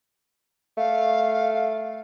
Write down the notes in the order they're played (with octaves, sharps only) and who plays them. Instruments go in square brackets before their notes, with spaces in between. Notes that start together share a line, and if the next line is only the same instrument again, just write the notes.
[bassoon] A3 [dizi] F5